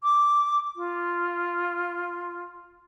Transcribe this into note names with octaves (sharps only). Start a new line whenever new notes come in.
D6
F4